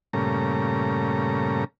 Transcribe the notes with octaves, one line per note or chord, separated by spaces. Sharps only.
G2 A#2 C#3 A3 A#5